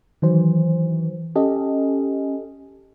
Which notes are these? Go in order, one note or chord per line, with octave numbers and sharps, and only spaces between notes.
D#3 E3 F#3 C5
C#4 G4 A4 D#5